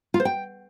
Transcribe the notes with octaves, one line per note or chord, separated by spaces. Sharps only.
F4
C5
G5